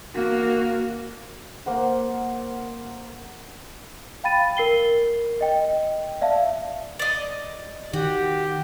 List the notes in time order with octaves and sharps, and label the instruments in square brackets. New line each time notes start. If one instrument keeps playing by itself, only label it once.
[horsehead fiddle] A#3 F#4
[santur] A#3 C5 F#5
[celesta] F5 G5 B5 A6 D#7
A#4 C7 G7
D#5 G5
D5 E5 F5 A5
[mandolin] D5 D#5
[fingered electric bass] D#3 [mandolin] F#4 [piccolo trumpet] G4